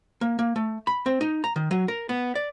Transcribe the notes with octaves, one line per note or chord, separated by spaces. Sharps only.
A#3
A#3
A3
B5
C4
D#4
A#5
D#3
F#3
A#4
B3
D5